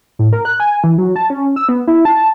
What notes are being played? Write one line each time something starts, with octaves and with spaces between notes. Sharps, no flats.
A2
A#4
F#6
G#5
E3
F#3
A5
C#4
E6
B3
E4
A5